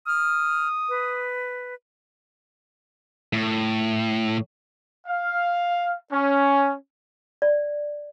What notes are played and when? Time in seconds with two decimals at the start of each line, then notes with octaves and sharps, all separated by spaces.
0.07 D#6 F6
0.89 B4
3.33 A2
5.08 F5
6.13 C#4
7.42 D5